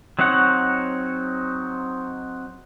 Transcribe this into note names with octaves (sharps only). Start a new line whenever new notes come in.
F#3 C4 D#4 C#5 F#5